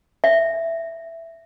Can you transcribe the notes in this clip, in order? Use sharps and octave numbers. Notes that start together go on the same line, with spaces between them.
E5